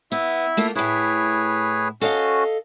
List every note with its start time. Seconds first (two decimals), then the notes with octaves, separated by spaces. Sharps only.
0.12 B3 E4 E5
0.57 A3 A#3 F4
0.76 A2 E4 G#4 B4 C#5
2.02 C#4 F#4 A4 D#5 F5